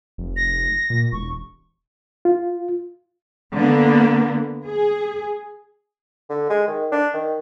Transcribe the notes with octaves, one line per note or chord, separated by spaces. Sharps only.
F1
A#6
A#2
E1 C#6
F4
D3 A#3 B3
G#4
D3
G#3
D#3
D4
D#3